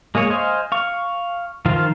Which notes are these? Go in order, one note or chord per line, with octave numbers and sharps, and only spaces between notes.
G#3 A#3 G#4 C#5
C5 D#5 F5 G#5
F5 C#6
D#3 F3 F4 C5 F5